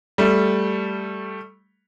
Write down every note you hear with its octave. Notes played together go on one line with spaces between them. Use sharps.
G3 A3